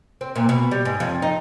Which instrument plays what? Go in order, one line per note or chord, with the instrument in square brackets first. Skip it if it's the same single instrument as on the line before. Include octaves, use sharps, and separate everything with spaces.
[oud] C4
A#2
B2
G3
G#2
F2
D#4